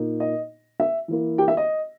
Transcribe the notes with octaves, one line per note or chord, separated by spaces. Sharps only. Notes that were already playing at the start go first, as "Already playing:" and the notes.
Already playing: A#2 A#3 D#4
D#5
E5
E3 A#3 E4
G4 G5
E5
D#5